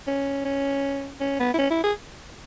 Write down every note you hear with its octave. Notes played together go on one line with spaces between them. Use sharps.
C#4
C#4
C#4
B3
E4
C#4
E4
G#4